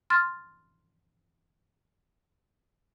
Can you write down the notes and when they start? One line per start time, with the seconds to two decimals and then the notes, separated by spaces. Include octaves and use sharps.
0.10 C6 F6 A6